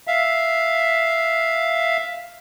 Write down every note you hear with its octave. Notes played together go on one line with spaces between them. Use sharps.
E5 F5